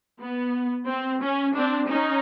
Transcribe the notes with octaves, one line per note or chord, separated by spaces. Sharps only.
B3
C4
C#4
C4 D4
C#4 D#4